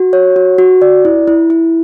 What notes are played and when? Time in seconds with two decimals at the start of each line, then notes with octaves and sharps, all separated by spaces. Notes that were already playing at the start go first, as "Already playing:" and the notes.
Already playing: F#4
0.13 C#5
0.36 F#4
0.58 F#4
0.82 D5
1.05 E4
1.28 E4
1.50 E4